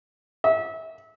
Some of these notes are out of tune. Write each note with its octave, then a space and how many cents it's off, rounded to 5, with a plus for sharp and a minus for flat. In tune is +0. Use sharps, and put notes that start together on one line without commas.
E5 -30